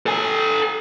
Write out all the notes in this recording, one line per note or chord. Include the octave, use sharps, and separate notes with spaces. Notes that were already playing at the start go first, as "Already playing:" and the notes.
A4 G#5